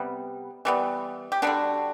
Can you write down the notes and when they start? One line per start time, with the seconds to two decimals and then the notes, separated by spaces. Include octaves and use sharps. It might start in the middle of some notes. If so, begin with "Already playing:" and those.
Already playing: C3 G3 B3
0.65 E3 G3 B3
1.32 G4
1.42 D3 G3 B3 D4 F#4